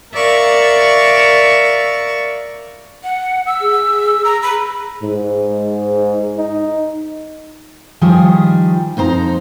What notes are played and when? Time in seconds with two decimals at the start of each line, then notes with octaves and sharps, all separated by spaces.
0.13 A#4 D5 E5 F5 C#6 A6
3.04 F#5
3.46 E6
3.61 G#4
4.25 A#5
4.42 B5
5.02 G#2
6.37 D#4
8.01 D#3 F3 G3 G#4
8.97 F2 D#4 C5 A#5